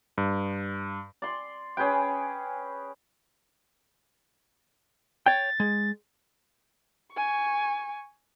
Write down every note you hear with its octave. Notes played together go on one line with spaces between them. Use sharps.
G2
D5 C6
C#4 G#4 B4 G5
C#5 G5 A6
G#3
G#5 C#6